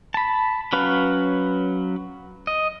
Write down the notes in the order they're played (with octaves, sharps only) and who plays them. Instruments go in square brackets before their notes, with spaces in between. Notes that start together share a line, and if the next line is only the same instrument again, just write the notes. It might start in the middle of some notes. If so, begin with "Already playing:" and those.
[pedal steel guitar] A5 B5
F#3 C#4 B4 F5
D#5